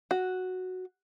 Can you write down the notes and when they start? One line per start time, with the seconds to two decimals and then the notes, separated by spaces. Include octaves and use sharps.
0.11 F#4